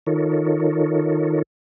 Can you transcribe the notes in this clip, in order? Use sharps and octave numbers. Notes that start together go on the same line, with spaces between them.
D#3 D#4 F4 A4 A#4 C#5